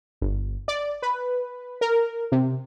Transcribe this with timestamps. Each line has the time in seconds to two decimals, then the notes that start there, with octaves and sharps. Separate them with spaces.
0.22 G1
0.68 D5
1.02 B4
1.81 A#4
2.32 C3